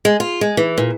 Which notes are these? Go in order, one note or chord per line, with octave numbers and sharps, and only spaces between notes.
G#3
F4
G#3
E3
A#2